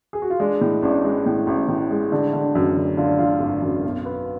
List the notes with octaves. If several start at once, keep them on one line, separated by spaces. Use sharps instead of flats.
G#4
F#4
F4
G#3 D4
A2
A1 D4
G#3
A2
A1
A2
G#3
D3
D3
F#2
D3
D3 F4
D4
D3 F4
G#1
F#2
B1
B3